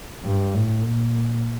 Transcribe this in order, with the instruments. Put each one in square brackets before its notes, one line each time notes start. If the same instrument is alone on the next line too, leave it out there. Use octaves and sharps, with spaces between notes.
[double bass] G2
A2
A#2